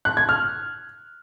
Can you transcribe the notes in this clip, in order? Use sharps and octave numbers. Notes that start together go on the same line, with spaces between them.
F#6
G#6
F6